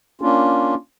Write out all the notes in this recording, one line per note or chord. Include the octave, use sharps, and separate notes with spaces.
A#3 C#4 D4 F4